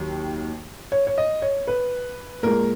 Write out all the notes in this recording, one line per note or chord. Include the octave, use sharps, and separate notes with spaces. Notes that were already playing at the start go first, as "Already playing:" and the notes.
Already playing: D#2 D#3 F#3
C#5
C#5
D#5
C#5
B4
A#2 G#3 A#4